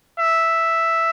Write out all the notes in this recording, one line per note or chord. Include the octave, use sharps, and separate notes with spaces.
E5